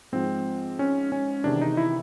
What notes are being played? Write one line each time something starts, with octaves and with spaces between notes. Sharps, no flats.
G#2 F3 C4
C#4
C#4
E2 C3 D#3 D4
D#4
E4